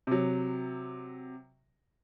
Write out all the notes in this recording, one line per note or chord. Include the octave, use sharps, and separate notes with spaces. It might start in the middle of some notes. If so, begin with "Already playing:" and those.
C3 F#3